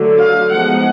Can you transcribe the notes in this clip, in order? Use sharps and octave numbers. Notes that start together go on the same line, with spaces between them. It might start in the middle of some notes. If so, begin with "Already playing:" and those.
Already playing: D3 F#3 A3
F5
F3 G#3 B3 D#4 F#5